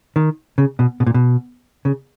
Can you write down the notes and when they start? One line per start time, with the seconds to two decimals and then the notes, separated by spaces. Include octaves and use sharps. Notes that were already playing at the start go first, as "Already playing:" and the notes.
0.16 D#3
0.58 C#3
0.79 B2
1.00 B2
1.06 A#2
1.14 B2
1.85 C#3